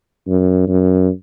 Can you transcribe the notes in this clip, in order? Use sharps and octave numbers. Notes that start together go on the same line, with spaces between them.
F#2
F#2